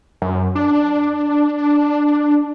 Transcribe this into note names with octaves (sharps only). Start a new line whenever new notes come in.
F#2
D4